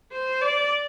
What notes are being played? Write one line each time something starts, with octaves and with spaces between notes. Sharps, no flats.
C5
D5